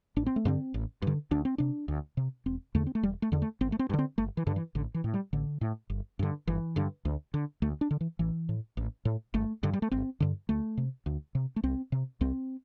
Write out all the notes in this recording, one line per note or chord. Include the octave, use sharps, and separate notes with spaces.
A1 D4
C4
A3
G2 D3 C4
A1
G2 D3
D2 D4
C4
C3 D4
D2
C3
E1 C4
E2 D3 A3
C4
A3
E1 G3
A3
E2 D3
A3
G1 C4
A3
C4
G2
D3
C4
G1 A3
E3
G2 D3
E3
A1 D3
E3
A2
G3
A1 D3
A2
G1
G2 D3
G1 E3
G2 D3
D2
D3
D2 A3
D4
D3
E3
A1 E3
A2
A1
A2
G1 A3
G2 D3
G3
A3
G1 C4
G2 D3
D2 A3
C3
D2
C3
A3
C2 C4
C3
C2 C4